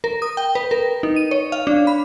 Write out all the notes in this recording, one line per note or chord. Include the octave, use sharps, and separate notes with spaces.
A#4
D#6
G5
B4
A#4
D#4
D#7
C#5
F5
D4
B5